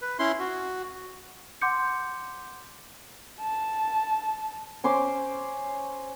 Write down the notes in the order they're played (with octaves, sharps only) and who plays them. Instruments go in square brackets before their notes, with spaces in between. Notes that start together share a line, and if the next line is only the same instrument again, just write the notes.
[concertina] B4
C#4 E4 C6
F#4
[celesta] F#5 C6 D6 G6 C#7
[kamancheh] A5
[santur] C#4 C5 C6 D6